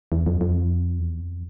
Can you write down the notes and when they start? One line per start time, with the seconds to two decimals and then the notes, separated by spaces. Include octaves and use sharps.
0.12 E2
0.26 F2
0.41 F2
0.99 E2
1.20 F2